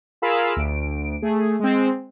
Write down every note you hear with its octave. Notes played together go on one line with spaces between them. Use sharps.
F4 G#4 A#4 F5 B5 E6
D2 D7
A3 G#4
G#3 C4